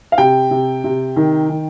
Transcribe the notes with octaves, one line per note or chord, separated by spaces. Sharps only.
F5
C3 G5
C3
C3
D#3
D#3